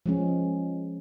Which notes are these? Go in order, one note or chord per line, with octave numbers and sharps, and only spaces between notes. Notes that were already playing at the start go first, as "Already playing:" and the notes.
F3 G#3 C#4